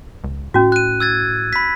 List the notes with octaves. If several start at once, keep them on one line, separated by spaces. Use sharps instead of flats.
C#2
A2 C#4 F#4
F#6 D#7
E6 G#6 A6
B5 B6